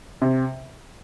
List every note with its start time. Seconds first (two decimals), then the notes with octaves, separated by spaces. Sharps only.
0.22 C3